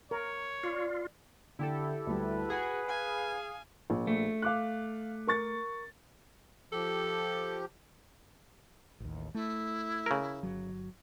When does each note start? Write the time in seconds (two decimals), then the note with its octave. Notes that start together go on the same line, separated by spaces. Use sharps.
0.11 A#4 C#5
0.63 C4 F4 D5
1.59 D3 E4 G4 A4
2.07 D2 G3 B4
2.50 F#4 G#4 B5
2.88 F5 G#5
3.90 A#1
4.07 A3
4.42 F5 D6 F#6
5.27 A#4 C#6 A6
6.72 F3 G4 A4
9.00 A1 D#2
9.34 A3 E4
10.06 C#3 A#4
10.43 G1 F#3